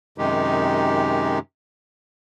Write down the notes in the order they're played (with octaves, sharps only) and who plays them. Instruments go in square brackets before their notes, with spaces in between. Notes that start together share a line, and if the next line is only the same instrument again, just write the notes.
[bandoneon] F#2 C3 D#3 G#3 D#4 G4